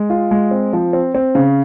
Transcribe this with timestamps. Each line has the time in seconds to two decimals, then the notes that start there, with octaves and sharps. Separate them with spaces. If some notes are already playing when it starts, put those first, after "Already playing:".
Already playing: G#3
0.10 F4
0.31 G#3
0.51 C4
0.73 F3
0.93 C4
1.15 C4
1.35 C#3